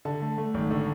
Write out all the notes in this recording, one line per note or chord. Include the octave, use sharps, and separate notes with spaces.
D3 A5
A3
A3
G#1
D3